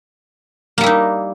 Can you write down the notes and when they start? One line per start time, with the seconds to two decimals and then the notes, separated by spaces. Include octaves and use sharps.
0.78 A#3
0.81 G3
0.83 E4
0.86 D#4